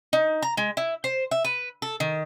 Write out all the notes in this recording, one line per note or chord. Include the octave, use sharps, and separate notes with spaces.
D#4
A#5
G#3
E4
C5
E5
B4
A4
D#3